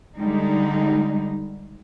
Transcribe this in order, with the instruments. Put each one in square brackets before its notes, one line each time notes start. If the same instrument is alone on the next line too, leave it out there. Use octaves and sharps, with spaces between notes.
[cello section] D3 G3 G#3 D#4